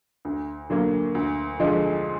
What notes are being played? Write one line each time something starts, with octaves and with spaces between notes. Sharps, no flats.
D2
D3 F#3 A#3
D2
D3 F3 G#3